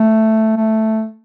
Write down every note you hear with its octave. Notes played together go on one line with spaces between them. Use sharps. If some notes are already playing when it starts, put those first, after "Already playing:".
Already playing: A3
A3